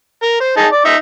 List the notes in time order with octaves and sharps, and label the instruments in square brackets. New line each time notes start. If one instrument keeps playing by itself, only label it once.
[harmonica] A#4
C5
D#4 G#4 A5
D5
D#4 E5